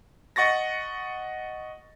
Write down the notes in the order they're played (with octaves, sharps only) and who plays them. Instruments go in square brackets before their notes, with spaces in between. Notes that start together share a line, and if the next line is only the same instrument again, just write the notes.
[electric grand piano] D#5 F#5 C#6 A6 A#6